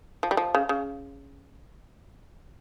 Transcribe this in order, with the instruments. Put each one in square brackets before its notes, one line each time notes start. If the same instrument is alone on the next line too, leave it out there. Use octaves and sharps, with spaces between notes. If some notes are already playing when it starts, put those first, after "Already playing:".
[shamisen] F3
G3
F3
C#3
C#3